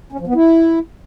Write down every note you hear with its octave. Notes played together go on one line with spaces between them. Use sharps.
C#4
F3
B3
E4